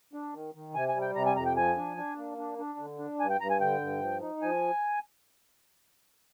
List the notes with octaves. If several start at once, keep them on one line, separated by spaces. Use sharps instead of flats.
D4
D#3
D#3
C3 G#5
G#5
G3
G5
C3 A#5
G#5
F2 A#5
G5
F3 G#5
D4
D4
A#3
D4
D4
D3
D4
G2 G#5
G5
G2 A#5
G#5
D3 G5
G2
F3
D#4
F3 G#5